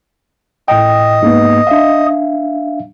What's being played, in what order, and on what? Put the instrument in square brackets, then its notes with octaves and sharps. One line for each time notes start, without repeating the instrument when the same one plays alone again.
[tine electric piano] A2 G5 [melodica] D#5
[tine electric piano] G#2 A#3 B3
D4 E5 F5